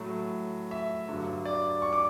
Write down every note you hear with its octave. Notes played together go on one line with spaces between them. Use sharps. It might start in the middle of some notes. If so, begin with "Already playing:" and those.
Already playing: A2 F#3 A3
E5
G2 D3 F#3
D5
C#6
D6